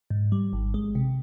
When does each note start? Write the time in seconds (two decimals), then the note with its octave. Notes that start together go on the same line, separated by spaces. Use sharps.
0.10 G#2
0.32 G3
0.53 G#1
0.74 G#3
0.95 C3